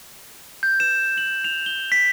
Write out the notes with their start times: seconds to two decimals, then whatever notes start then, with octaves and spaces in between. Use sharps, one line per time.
0.63 G6
0.80 E7
1.18 F#7
1.44 F7
1.66 G7
1.92 B6